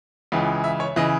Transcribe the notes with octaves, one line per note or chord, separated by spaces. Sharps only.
C#2 C#3 E3
E5
C#5
C#3 E3 D#5